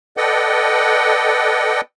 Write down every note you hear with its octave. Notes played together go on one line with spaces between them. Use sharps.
A4 B4 D5 D#5 F#5 G5